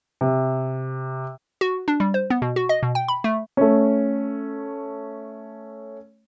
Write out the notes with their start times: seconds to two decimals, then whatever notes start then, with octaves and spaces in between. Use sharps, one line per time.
0.21 C3
1.61 F#4
1.88 D4
2.00 G3
2.14 C5
2.30 B3
2.42 B2
2.56 F#4
2.69 D#5
2.83 B2
2.95 G5
3.08 B5
3.24 A3
3.57 A3 C#4